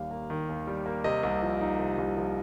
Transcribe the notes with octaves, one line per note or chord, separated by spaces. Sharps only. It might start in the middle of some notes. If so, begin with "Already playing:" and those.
Already playing: D#2 D#3 G3 F5
A#3
D#3
D#2
G3
A#3
C3 D#5
C2
F3
D#4
C3
C2
F3